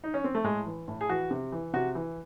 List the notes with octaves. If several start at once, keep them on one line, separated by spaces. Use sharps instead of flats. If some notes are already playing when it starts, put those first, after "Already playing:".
D#4
C#4
C4
A3
A2 G#3
E3
A2
G#4
E3 F#4
C3
E3
C3 F#4
E3